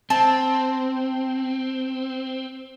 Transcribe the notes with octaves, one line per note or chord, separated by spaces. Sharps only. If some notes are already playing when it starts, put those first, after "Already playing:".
C4 A5